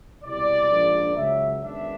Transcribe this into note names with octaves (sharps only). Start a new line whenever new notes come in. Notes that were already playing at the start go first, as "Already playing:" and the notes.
C2 B2 G3 D5
A#1 G#2 F3 A#3 D4
C#2 C#3 F#3 E5
F#2 D#3 G#3 B3 D4 E5